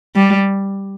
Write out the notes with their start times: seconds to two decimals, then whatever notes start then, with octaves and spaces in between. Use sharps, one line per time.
0.16 G3